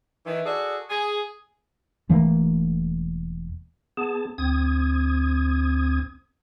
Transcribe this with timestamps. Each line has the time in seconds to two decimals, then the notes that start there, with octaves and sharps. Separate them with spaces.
0.25 D#3 E3
0.45 F#4 G#4 A4 D5
0.89 G#4
2.09 E1 E3 A3 A#3
3.97 B3 G#4 A5
4.38 D2 C4 D#6 G#6